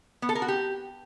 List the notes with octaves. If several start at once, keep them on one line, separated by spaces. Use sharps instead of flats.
B3
A4
A#4
F#4
G4